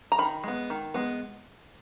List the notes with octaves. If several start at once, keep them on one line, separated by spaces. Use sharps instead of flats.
A#5
D#3 B5
G#3 B3
D#3
G#3 B3